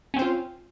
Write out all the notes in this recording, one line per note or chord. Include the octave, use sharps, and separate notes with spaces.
C4 C#4 F4 C5